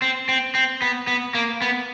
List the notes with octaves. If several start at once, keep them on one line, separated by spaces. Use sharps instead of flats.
C4
C4
C4
B3
B3
A#3
B3